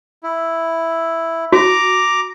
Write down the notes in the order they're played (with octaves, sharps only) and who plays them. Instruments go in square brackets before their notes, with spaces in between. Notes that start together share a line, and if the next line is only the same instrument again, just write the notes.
[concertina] E4
[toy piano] F#4 [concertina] A#5 D6